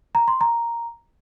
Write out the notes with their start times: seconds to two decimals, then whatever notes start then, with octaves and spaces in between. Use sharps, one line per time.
0.15 A#5
0.28 C6
0.41 A#5